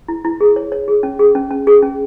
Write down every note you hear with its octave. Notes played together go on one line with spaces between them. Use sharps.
E4
E4
G#4
C#5
C#5
G#4
C#4
G#4
C#4
C#4
G#4
C#4